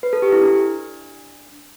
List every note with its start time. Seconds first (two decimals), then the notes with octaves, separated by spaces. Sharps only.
0.03 B4
0.13 A4
0.22 G4
0.32 E4
0.42 D4